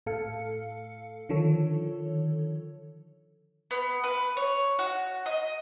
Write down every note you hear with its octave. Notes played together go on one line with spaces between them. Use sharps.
A2 A4 F5 C#7
D3 D#3 F3 A4 C#5
B3
B4
C#5
F#4
D#5